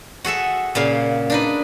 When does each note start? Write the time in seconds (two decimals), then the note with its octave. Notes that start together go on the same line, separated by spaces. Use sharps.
0.25 F#4 G#4 A4 E5
0.75 A#2 C#3 F5
1.30 D4 D#4 B4